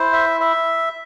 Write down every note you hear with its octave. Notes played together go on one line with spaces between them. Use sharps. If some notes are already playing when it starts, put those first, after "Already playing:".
Already playing: E4 C5
E5
E5